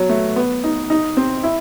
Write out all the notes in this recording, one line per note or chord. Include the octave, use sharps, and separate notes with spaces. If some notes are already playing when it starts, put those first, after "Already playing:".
Already playing: F#3 B3
A3
B3
D#4
D#4
C4
E4